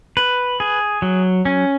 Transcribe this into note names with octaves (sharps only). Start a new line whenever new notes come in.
B4
G#4
F#3
C#4